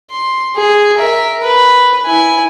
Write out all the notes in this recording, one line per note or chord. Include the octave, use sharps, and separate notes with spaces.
C6
G#4
A#4 E5
B4
E4 G#5